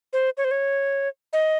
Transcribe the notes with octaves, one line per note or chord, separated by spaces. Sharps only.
C5
C#5
C5
C#5
D#5